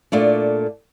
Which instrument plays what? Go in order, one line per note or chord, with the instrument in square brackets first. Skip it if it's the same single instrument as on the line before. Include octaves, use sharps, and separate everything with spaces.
[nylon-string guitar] A#2 A3 D4